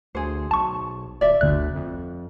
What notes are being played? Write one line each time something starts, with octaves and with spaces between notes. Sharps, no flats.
D2 G#4 C5
B1 A5 C#6
D1 D5 E5
G1 D2 F#6
F2